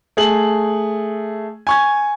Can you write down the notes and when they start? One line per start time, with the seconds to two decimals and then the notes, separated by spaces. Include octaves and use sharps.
0.17 A3 G#4 F#7
1.67 G#5 C#6 G#6